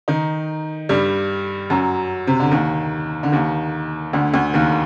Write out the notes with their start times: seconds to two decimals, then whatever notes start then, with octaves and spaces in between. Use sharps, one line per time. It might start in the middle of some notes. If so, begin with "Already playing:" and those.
0.08 D#3 D#4
0.89 G2 G3
1.70 F#2 F#3
2.27 C3
2.40 D3
2.51 D#2 D#3
3.23 D3
3.32 D#2 D#3
4.13 D2 D3
4.34 D2 D3
4.54 D#2 D#3